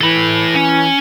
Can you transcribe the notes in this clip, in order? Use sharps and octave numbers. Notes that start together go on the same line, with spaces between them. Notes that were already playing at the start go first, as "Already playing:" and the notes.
E3 A4 B5
C#4